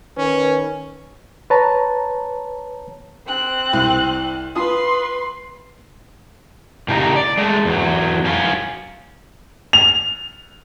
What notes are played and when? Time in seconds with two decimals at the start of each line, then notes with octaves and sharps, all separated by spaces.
0.18 D#3 C#4 A#4 B4
1.50 B4 C#5 A5 A#5
3.27 C4 F#6
3.73 C2
4.56 F4 B4 C6 D#6
6.88 A2 C#3 G4 A4 D#5 A#5
7.16 D5
7.38 G#3 A3
7.65 E2 F#3
8.24 F#2 C#4 F4
9.73 F7